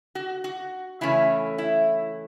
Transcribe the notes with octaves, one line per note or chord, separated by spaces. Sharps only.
F#4
F#4
C#3 E3 A3 C#4 E4
E4